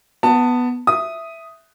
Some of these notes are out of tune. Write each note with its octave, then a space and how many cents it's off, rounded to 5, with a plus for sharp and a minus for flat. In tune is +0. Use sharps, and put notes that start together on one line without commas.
B3 +0 A5 +20
E5 +0 D#6 +0